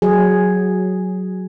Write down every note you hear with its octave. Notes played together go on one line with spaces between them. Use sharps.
F#3 G#4